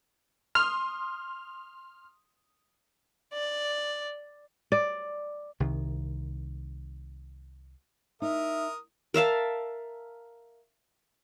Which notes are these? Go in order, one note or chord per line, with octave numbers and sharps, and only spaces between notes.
C6 D#6 F6
D5
D5
C2 D#3
D#4 A#4 E5 D#6
A#4 E5 F5 A5